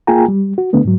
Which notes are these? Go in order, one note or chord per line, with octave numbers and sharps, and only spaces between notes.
A#3 F4 G#4 G5 G#5 A#5
G3
F#4
D3 A3 B3 D4
G#2 F#3